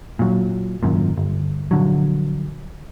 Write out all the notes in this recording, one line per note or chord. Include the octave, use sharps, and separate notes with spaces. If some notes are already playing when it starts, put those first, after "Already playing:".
A#2 F#3
G#1 F#2 A#2
G1
A#1 D3 F#3